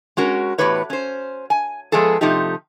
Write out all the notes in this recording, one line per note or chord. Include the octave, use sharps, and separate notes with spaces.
G#3 C#4 F#4 A#4
E2 A2 F#3 G4 B4 C#5
C#4 C5
G#5
F3 G#3 B3 G#4 A4
C3 F3 A3 D#4 G4